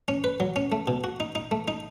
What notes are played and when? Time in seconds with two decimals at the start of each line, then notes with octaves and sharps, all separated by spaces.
0.08 C#4
0.24 B4
0.40 F#3
0.56 C#4
0.72 A3
0.87 B2
1.04 F#4
1.20 D#4
1.35 D#4
1.51 A3
1.68 D#4